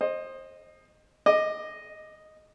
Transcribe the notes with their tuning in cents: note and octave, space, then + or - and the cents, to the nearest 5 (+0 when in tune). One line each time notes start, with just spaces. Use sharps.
C5 +25 D#5 -10
D#5 +0 D6 +25